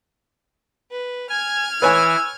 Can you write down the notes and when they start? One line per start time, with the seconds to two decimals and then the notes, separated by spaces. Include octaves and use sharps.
0.91 B4
1.30 G#5 F6 G#6
1.82 E3 B4 C#5 G#5 E6